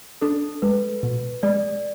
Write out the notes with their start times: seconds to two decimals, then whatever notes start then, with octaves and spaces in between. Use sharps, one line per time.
0.21 D4 A4
0.62 G#3 B4
1.03 B2
1.43 G#3 D5